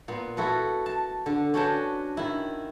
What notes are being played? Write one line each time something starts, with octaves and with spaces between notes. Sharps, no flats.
A#2 B3
E4 F#4 A4 B4
A5
D3
C#4 D4 F#4 B4 G5 A5
D#3 E4